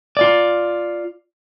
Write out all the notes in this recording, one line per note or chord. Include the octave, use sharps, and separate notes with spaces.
F4 D5